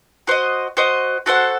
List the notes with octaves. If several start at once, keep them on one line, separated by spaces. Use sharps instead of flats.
F#4 C5 D#5
F#4 C5 D#5
F#4 A4 C5 F#5